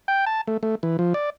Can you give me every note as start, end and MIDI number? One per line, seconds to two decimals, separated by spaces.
0.08 0.25 79
0.26 0.41 81
0.47 0.57 57
0.63 0.75 57
0.83 0.97 52
0.99 1.13 53
1.14 1.30 74